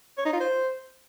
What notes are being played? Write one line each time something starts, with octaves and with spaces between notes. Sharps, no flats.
C#5
D#4
F4
C5